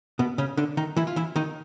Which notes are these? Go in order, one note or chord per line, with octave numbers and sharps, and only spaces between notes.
B2 B3
C#3 C#4
D3 D4
D#3 D#4
E3 E4
F4
E3 E4
D#3 D#4